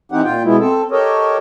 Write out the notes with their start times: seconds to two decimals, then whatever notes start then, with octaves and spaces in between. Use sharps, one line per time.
0.12 E3 C4 D#4 G4 F#5
0.24 A#2 F4 G5
0.44 B2 G#3 B3 E4
0.59 C4 A4
0.91 G4 A4 A#4 C#5 D#5